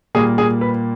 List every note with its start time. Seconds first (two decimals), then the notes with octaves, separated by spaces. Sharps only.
0.15 A#2 G3 A#3 G#4
0.38 G#4
0.61 B4